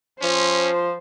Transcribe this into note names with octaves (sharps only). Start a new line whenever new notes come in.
F3 C#4 C5